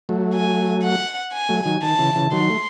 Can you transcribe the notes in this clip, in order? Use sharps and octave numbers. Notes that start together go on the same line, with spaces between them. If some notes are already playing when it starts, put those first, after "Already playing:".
F#3 A3
G#5
F#5
G#5
F#3 A3
D#3 F#3
D#3 A5
C#3 E3
C#3 E3
D#3 F#3 C6
A3